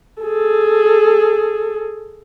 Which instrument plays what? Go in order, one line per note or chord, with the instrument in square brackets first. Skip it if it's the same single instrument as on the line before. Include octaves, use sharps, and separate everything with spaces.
[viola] G#4 A4